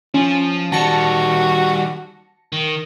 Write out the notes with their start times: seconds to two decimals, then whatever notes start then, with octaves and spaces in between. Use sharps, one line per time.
0.14 F3 C#4
0.72 D#3 G3 F#4 A5 A#6 C#7
2.52 D#3